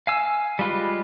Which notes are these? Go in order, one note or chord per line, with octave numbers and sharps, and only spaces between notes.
F5 G#5 E6
G3 G#3 F4 B4